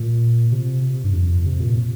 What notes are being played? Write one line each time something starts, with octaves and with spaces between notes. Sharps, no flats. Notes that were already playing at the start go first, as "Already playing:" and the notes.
Already playing: A#2
C3
G2
F2
C3
A#2